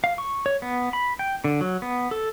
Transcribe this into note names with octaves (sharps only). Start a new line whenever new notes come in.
F5
C#6
C#5
B3
B5
G5
D3
F#3
B3
A4